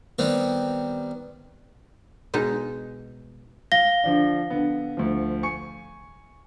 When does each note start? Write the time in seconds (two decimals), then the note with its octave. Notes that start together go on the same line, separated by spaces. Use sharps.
0.19 D#3 G3 B3 C4
2.34 B2 G#3 D#4
3.72 F5 A#6 G7
4.04 D3 F3 D4
4.50 D3 B3
4.97 D2 F3
5.43 G#5 C#6 C#7